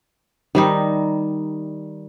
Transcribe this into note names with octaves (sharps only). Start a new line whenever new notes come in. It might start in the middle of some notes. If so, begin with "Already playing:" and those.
D#3 G3 D#4